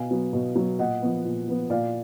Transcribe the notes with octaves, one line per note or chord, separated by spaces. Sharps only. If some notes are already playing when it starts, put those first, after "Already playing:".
Already playing: B2 F5 G#5
F#3 B3
B2
F#3 B3
A#2 D#5 F#5
F3 B3
A#2
F3 B3
A#2 D5 F5